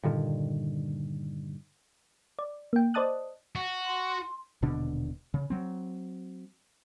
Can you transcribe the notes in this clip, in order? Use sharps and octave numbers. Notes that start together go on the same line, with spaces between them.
G2 A#2 D3 D#3
D5
A#3 G5
C5 D5 D#5 A5 D#6 F#6
F#4
C6
D#1 B2 D3 D4
C#3
F#3 C4